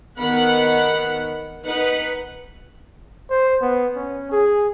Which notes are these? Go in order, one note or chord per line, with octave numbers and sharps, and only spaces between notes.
D#3 B3 A#4 F#5 B5
D#4 B4 F#5
C5
B3
C#4
G#4